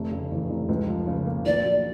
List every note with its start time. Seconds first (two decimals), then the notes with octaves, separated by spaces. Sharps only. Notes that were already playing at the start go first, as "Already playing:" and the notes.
Already playing: F1 A3
0.11 C#3
0.32 E2
0.50 F1
0.69 C#2
0.88 F3
1.07 C#3
1.27 A#3
1.46 A#1 D5
1.64 F#3